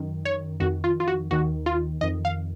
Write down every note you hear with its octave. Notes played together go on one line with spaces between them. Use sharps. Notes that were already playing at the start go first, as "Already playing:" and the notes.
Already playing: F#2 D#3
C#5
F2 D#3 F#4
F4
F4
F#4
D#2 D#3 F#4
F4
F2 D#3 D#5
F5